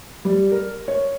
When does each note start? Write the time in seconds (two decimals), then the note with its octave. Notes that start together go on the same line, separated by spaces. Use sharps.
0.25 G3
0.52 A#4
0.88 C#5